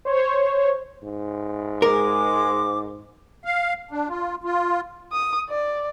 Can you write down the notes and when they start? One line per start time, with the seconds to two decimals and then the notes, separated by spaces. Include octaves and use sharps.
0.05 C5 C#5
1.03 G#2
1.82 G#3 A#4 D6
3.45 F5
3.91 D4
4.09 F4
4.44 F4
5.12 D#6
5.49 D5